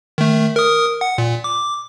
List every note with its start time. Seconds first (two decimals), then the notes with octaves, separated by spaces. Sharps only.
0.18 D#3 A3
0.56 A#4 D#6
1.01 F#5
1.18 A#2
1.44 D6